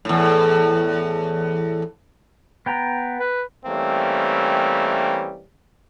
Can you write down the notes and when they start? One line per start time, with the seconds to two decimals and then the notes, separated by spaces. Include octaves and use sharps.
0.05 E2 A2
2.66 B3 G5 A#5
3.19 B4
3.66 E3 G3 A3 A#3 C4 C#4